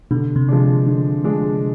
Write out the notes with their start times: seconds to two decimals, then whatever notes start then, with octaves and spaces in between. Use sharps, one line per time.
0.11 B2 D3
0.36 C3
0.48 F3 G#3 D4
0.86 D3
1.24 F3 G#3 D4